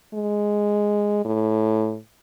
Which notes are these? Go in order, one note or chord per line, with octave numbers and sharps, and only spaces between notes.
G#3
A2